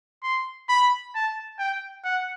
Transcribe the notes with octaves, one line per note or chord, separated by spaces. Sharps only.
C6
B5
A5
G5
F#5